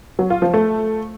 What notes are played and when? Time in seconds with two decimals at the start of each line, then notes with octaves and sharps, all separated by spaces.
0.19 F#3
0.30 F4
0.42 F3
0.53 A3